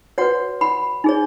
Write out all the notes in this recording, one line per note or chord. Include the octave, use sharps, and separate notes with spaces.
F#4 B4 C#5 F#5
F#5 B5
D#4 G#4 C#5